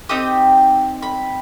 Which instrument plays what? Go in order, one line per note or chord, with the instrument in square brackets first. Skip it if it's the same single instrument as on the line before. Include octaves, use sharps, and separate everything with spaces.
[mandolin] C4 D#4 G4 D#6
B5